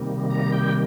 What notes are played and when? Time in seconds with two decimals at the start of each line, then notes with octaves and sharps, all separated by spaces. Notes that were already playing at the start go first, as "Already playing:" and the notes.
Already playing: C3 D#3 G3 A#3
0.30 A#5
0.52 G5